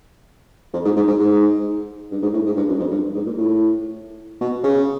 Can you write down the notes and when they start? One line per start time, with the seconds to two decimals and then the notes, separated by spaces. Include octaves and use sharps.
0.73 F2
0.85 G#2
0.97 G#2
1.08 G#2
1.19 G#2
2.12 G2
2.22 G#2
2.34 A2
2.46 G#2
2.57 G2
2.69 F#2
2.80 F2
2.91 G2
3.15 G#2
3.26 A#2
3.38 A2
4.41 B2
4.64 C#3